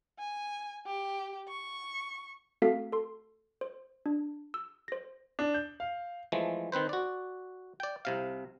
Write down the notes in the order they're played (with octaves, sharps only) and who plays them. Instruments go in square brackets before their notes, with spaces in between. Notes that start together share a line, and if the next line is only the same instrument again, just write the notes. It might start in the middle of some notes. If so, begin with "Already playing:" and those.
[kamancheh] G#5
G4
C#6
[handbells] A3 C4 F#4 A4 F5 B6
A4 C6
C5
D4
E6
C5 A#6
[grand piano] D4
G6
F5
[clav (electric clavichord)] E3 F3 G#3 A3
D#3 C4 B4 C5
F#4 D5
D5 G5
C2 C3 F5